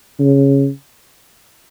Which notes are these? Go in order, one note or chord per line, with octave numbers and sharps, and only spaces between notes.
C#3